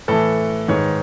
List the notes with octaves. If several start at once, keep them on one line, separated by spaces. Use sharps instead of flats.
A2 E3 A4 B4
G#2 D#3 B4 C#5